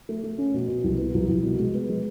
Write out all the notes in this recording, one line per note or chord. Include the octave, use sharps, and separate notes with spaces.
A3
A3
C#4
B2
B2
C2
B3
C2
C2
B2
G#3
B3
G#3